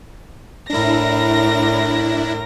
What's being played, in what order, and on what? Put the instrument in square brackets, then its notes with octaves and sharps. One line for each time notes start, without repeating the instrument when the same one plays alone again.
[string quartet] A2 A#4 A#6 [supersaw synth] D4 E4